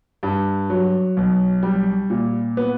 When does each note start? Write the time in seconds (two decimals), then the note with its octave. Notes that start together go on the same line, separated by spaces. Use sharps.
0.23 G2
0.70 F#3
1.17 B1
1.63 G3
2.10 A#2
2.57 B3